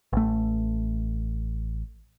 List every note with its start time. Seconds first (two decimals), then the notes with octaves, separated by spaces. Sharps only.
0.13 A1 A3